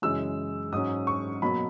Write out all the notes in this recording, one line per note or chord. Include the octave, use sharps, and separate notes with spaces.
F#2 C#3 E3 G#3 E6
G#2 F#3 C#4 D#6
C#6
B2 F#3 A#3 B5